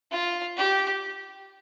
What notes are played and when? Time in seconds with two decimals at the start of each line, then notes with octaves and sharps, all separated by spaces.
0.12 F4
0.57 G4